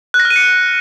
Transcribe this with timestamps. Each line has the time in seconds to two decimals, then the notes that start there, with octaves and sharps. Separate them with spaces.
0.14 F#6
0.20 A#6
0.25 F6
0.30 D#7
0.36 C#7